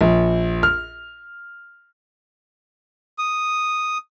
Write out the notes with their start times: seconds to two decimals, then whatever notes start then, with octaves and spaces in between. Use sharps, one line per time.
0.01 A#1
0.63 F6
3.18 D#6